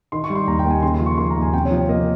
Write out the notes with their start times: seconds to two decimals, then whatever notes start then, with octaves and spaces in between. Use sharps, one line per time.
0.12 D#3 C6
0.24 C#6
0.30 G3
0.35 C6
0.47 D#2 A#5
0.59 G5
0.65 D#2
0.70 G#5
0.83 C#3 C6
0.94 C6
1.00 F3
1.06 C#6
1.18 A#3 C6
1.31 A#5
1.36 D#2
1.42 G#5
1.53 C3 G5
1.65 C#5
1.71 F3
1.77 C#5
1.89 A#3 D#5